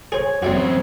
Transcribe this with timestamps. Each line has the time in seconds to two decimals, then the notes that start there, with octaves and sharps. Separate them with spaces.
0.12 G#4 C5 C#5
0.42 F#2 G3 C4 E4 F#4